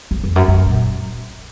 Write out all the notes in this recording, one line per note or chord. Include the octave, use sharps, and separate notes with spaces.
F2
F2
F#2
F#2
A#2